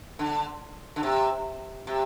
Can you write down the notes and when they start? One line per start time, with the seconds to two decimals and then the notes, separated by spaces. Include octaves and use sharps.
0.19 D3
0.96 D3
1.03 C3
1.87 C3